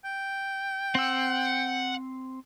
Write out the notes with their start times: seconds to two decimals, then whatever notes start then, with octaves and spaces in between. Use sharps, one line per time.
0.05 G5
0.95 C4 F#5 E6